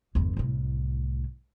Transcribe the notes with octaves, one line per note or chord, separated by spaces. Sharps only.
G1 E2
C2 A2